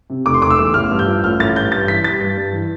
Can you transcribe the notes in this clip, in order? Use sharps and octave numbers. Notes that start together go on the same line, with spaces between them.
C3
F1 D6
C6
F1 D6
E6
E2
A1 F6
G2
G6
F3
A1 F6
A1 A6
G2 G6
G2 A6
E3 B6
G3 A6
G2
G2
E3